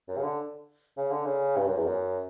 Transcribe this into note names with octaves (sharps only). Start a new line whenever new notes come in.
F#2
C#3
D3
C#3
D3
C#3
G2
F#2
E2
F#2